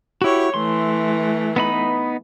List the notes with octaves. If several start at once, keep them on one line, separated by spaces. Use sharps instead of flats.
E4 F#4 G4 C#5
E3 A3 C6
B3 D#4 B5